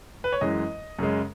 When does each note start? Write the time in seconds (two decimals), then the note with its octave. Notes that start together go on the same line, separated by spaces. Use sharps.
0.24 B4
0.32 C#5
0.41 F#2 E3 G#3 D#5
0.99 F#2 C#3 G#3